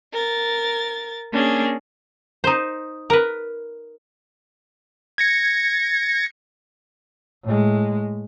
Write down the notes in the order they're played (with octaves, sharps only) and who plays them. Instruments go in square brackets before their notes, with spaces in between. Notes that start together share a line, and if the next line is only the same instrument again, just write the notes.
[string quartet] A#4 A6
A#3 C#4 D4 G#4
[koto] D#4 C5
A#4 B4
[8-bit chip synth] G#6 A#6 C#7
[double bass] A2 G#3